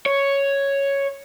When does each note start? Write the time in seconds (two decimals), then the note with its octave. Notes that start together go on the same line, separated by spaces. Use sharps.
0.06 C#5